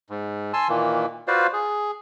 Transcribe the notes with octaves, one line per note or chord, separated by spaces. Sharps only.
G#2
G#5 A5 C6 E6
A#2 D#3 E3 A#3
F4 F#4 B4 C5 D5 F5
G#4